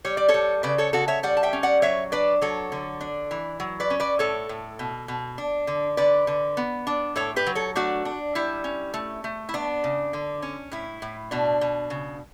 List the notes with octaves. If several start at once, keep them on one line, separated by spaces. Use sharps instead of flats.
G3 C#5
D5
A4 C#5
G3
C#3 B4 D5
A4 C#5
C#3 F#4 A4
C#5 E5
G3 D5 F#5
A5
E5 G5
C#4
D5 F#5
F#3 C#5 E5
D4 B4 D5
F#3 A4 C#5
D3
D4
E3
F#3
B4 D5
C#4
B4 D5
A2 A4 C#5
A2
B2
B2
D4
D3
D3 B4 D5
D3
B3
D4
A2 A4 C#5
G4 B4
F#3
A4 C#5
A3 D4 F#4
D4
G3 E4
C#4
A3
A3
E4
B3 D4
C#3
D3
C#4
A2 E4
A2
B2 D4
B2
C#3